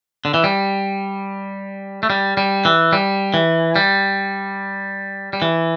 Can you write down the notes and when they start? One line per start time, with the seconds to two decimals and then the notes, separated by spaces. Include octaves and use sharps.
0.25 D3
0.34 E3
0.44 G3
2.03 A3
2.10 G3
2.37 G3
2.65 E3
2.93 G3
3.34 E3
3.76 G3
5.33 G3
5.42 E3